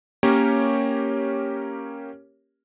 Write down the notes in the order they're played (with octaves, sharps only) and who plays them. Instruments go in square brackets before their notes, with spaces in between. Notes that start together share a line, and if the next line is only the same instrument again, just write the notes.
[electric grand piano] A#3 C#4 G4 A#4 C#5